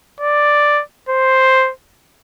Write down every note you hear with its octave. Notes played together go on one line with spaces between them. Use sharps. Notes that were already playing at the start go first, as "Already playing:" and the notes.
D5
C5